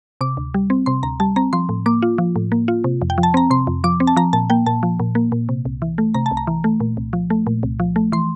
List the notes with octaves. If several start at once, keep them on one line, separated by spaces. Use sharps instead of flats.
C3 D6
D2
G3
C4
C3 C6
D2 A#5
G3 A5
C4 A#5
F3 C6
A2
A#3 D6
F4
F3
A2
A#3
F4
C3
F2
G5
F3
A5
C4 A#5
C3 C6
F2
F3 D6
C4
A5
F3 A#5
A#2 A5
A#3 G5
A#2 A5
F3
A#2
A#3
A#2
C3
C2
E3
A3
C3 A#5
A5
C2
A#5
E3
A3
A#2
C2
F3
A3
A#2
C2
F3
A3
E3 C6